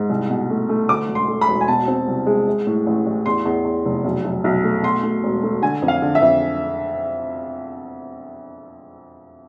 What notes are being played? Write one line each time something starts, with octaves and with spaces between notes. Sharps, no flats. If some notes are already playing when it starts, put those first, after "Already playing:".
Already playing: G#2
C2
B2
A3
A3
D2 D6
E1
C6
A3
B5
E1
G#5
B2 A5
C4
C2
G#3
G#3
A2
A1
A1
E2 C6
E2
E2
F1
B1
B1
B1
A3
B2 C6
A3
E1
A3
D3 G#5
F2
F5
D3
E5
F2